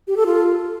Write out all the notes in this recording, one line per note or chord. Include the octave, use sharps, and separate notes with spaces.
G4
A4
F4